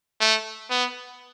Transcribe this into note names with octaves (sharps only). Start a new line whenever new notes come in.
A3
B3